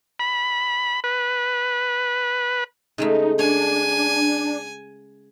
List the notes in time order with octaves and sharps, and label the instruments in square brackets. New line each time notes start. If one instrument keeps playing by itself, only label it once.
[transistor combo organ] B5
B4
[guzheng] C#3 G#3 A3 [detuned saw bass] D#4
[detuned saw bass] D4 [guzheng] C#5 [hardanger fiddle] G#5